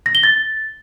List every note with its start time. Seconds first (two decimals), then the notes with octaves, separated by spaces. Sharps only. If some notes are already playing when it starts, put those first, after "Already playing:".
0.06 A#6
0.15 G7
0.23 A6